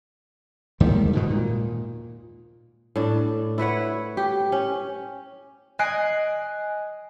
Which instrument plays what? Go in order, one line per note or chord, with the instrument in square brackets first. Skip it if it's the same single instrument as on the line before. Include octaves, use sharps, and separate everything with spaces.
[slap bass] D#2 G#2 D#3 G3
G#2 B2 D#3
A#2
[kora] A2 D4
E4 B4 C#5 F#5
G4
C#4
[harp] D#5 G#5 F#6 G#6 C7 D7